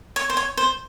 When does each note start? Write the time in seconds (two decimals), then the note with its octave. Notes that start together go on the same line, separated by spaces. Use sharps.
0.16 C#5
0.30 C5
0.37 C#5
0.57 C5